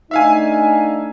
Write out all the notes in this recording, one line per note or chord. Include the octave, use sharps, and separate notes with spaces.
A3 D4 D#4 E5 F5 G#5